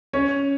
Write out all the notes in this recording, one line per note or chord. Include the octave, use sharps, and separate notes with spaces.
C#4 C#5